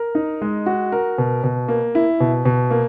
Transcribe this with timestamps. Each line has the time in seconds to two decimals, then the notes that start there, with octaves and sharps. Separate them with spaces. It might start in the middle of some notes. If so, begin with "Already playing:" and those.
Already playing: A#4
0.15 D#4
0.42 G#3
0.66 F#4
0.92 A#4
1.18 B2
1.44 B2
1.68 A#3
1.95 E4
2.20 B2
2.45 B2
2.71 A#3